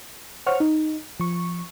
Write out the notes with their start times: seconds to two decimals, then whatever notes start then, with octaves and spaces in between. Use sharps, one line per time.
0.46 C5 C#5 F#5 C#6 F6
0.60 D#4
1.20 F3 C#6